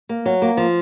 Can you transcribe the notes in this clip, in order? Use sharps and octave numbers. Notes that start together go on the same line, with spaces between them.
A#3
F#3
A#3
F3